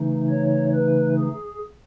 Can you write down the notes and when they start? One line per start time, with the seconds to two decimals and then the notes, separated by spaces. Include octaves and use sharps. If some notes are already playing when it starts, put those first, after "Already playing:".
Already playing: C#3 E3 A3 D#4
0.29 C#5
0.74 B4
1.18 G#4